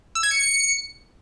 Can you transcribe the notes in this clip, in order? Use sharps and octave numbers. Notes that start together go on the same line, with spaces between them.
E6
G#6
C#7